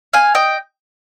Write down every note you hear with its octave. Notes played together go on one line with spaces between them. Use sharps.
F5 G#5
D#5 G5